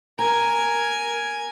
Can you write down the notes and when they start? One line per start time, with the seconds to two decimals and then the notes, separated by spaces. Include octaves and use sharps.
0.19 A#4 G#5 A#5